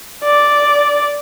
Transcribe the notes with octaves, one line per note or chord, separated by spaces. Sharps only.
D5